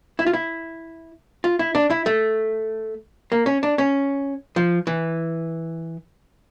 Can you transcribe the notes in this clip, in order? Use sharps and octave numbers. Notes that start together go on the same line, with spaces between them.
E4
F4
E4
F4
E4
D4
E4
A3
A#3
C#4
D4
C#4
F3
E3